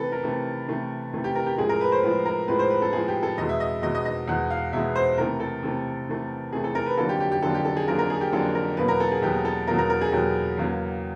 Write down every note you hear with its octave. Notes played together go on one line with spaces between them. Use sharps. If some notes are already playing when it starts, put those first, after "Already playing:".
Already playing: C3 E3 A3 A4 B4
A#4
C3 E3 A3
C3 E3 A3
C3 E3 A3
G4
A#4
G4
A2 F3 G#3 G#4
A#4
B4
C5
A2 F3 G#3 B4
A#4
A2 F3 G#3 B4
C5
B4
A4
A2 F3 G#3 G#4
G4
A4
E2 B2 G#3 D#5
E5
D#5
E2 B2 G#3 D#5
D#5
D#5
E2 B2 G#3 F#5
F5
E2 B2 G#3 E5
C5
C3 E3 A3 A#4
A4
C3 E3 A3
C3 E3 A3
C3 E3 A3 G#4
A4
A#4
B4
F2 D3 F#3 A#3 A4
G4
G4
G4
F2 D3 F#3 A#3 A4
G4
A4
G#4
F2 D3 F#3 A#3 A#4
A#4
G#4
G4
F2 D3 F#3 A#3 A4
A#4
E2 B2 F#3 A#3 B4
A#4
A4
G#4
E2 B2 F#3 A#3 G4
A4
E2 B2 F#3 A#3 A#4
A#4
A#4
G#4
E2 B2 F#3 A#3 G4
E2 C#3 F#3 A#3